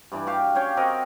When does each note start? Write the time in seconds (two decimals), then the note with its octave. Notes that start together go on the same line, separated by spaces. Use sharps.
0.12 G2 E3 D4
0.27 F#4 G4 F5
0.55 C#4 C#5 F5 G5
0.77 C4 F#4 A#4 D#5